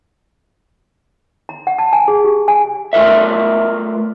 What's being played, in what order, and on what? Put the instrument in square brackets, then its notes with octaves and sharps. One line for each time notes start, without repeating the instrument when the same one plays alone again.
[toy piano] A#5
F#5
A5
G#5
G#4
G4
G#5
[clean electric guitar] A3 F4 A#4 B4 E5